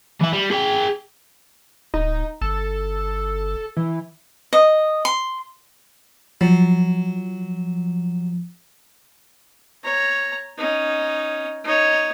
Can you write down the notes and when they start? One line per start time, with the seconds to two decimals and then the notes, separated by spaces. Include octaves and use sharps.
0.21 E3 E5
0.33 G3
0.51 G#4 G5
1.94 D1 D#4
2.41 G1 A4
3.77 E3
4.53 D#5
5.05 C6
6.41 F3 F#3
9.84 C#5 A#5
10.58 C#4 D#4
11.64 D#4 C#5